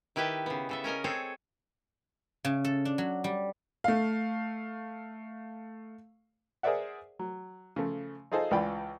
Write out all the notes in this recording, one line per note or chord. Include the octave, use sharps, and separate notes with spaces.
D#3 E4 G4 B4 G5 A5
C#3 B3
C#3 A4 E5
C#4 A#4 D#5 G#5
C4 G#4 A4 C#5
C#3
A4
D4
F#3
G3
A3 F5
G#4 A#4 C5 D5 E5 F#5
F#3
C#3 F3 A3
D#4 F4 G#4 A4 C5 D#5
C#2 E3 F4 D5 G5 B5